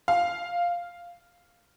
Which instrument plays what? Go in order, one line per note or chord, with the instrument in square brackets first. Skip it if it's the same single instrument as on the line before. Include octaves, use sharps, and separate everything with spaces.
[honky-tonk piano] F5